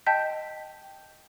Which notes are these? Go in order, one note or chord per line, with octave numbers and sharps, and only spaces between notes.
D#5 G5 A5 G6 B6